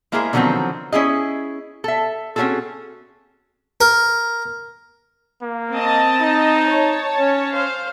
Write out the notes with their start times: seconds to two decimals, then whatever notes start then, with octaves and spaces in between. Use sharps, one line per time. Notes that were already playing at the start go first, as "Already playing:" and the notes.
0.12 G#3 A#3 E4 G#4 A#4 C5
0.33 D3 D#3 F3 F#3 B3 C4
0.92 C#4 E4 G#4 D#5
1.84 A4 E5
2.36 C4 C#4 D#4 F#4 G#4 A4
3.81 A#4
5.42 A#3
5.72 C4 D#5 A5
6.21 D#4
6.64 C#5 A5
7.19 C#4
7.53 C5 F5